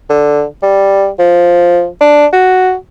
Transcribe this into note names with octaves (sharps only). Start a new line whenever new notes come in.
D3
G3
F3
D4
F#4